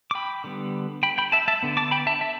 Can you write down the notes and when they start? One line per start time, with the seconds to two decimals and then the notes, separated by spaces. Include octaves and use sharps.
0.11 D6
0.15 G5 B5
0.44 D3 G3 B3
1.03 G5 B5
1.18 G5 B5
1.32 E5 A5
1.48 E5 A5
1.63 D3 B3
1.77 A5 D6
1.91 G5 B5
2.07 E5 A5
2.21 E5 A5